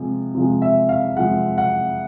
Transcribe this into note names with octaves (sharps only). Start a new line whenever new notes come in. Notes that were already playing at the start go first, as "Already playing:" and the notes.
Already playing: C3 F3 G#3
C3 F3 G#3
E5
F5
C3 F3 G#3 F#5
F#5